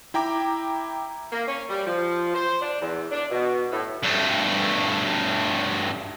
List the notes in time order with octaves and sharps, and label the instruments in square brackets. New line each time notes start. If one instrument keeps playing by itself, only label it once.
[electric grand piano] E4 G5 A#5 D6
[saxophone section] A#3
C#4
G3
F3
C5
D4
E2
D4
B2
A2
[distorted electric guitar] G2 A3